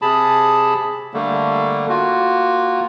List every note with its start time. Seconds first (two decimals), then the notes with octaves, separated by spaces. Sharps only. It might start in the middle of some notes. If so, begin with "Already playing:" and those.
0.02 C3 G#4 A5 B5
1.14 D3 G3 A3 A#3
1.89 A#3 F4 F#4